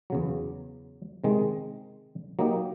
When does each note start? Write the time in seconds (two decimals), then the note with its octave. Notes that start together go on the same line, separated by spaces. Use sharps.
0.10 E2 C#3 F#3
1.24 C3 D#3 G#3
2.39 F#3 A#3 D#4 G4